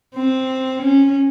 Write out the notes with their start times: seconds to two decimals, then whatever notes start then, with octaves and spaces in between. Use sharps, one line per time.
0.16 C4
0.83 C#4